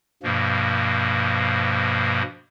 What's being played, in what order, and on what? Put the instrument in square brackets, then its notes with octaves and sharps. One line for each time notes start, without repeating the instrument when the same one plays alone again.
[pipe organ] G2 B2 F3 A#3